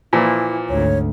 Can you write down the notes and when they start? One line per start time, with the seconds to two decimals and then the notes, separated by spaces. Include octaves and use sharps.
0.13 A#2 E3 F3 E4
0.69 G#1 D2 C#5